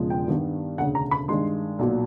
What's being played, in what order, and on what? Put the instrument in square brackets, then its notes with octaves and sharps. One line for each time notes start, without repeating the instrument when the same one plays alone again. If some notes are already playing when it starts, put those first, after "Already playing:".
Already playing: [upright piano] E1 E2 C#3 F3 G#3
G5
G2 D#3 G3 B3
E1 D2 C#3 F#5
A#5
B5
G2 D#3 G#3 C6
B1 A#2 F#3